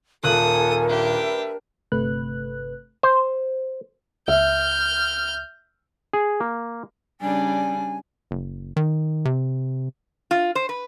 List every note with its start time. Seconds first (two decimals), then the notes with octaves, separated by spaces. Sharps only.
0.24 D#1 A4 A#4 G#5 D#6 F#6 F#7
0.88 D4 G4 B4 E5
1.92 G1 C3 A3 B4 F#6
3.03 C5
4.28 C#2 E5 F6 G6
6.13 G#4
6.40 A#3
7.21 C#3 G3 D4 G#5
8.31 F#1
8.76 D#3
9.25 C3
10.31 F4
10.55 C5
10.69 B4